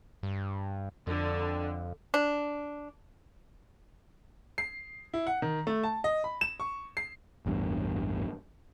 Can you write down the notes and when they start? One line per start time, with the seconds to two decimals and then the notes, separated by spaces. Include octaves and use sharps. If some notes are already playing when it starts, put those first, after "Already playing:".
0.23 G2
1.07 F2 D3
2.14 D4
4.58 C7
5.14 E4
5.27 F#5
5.42 D#3
5.67 A3
5.83 A5
6.04 D#5
6.24 B5
6.41 E7
6.60 C#6
6.97 C7
7.46 A1 E2 G2